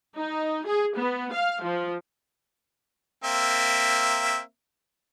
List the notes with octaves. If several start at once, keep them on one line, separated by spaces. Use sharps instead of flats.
D#4
G#4
B3
F5
F3
A#3 C4 E5